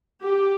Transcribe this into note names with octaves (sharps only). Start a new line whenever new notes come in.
G4